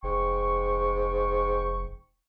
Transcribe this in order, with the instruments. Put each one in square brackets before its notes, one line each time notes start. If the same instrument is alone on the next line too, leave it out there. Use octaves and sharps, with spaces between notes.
[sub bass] F1 [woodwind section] G#2 G5 C#6